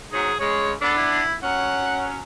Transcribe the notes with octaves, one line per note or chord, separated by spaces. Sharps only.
G#2 F#3 D#4 G#4
C#3 G#3 C#5
B3 D4 A4
E4
F#3 C#4 F#5